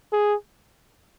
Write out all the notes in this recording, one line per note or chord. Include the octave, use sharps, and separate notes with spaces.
G#4